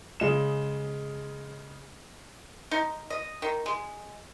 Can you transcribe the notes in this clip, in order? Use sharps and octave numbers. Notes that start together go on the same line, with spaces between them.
C#3 G#3 E7
D#4
D#5
D#3
G#3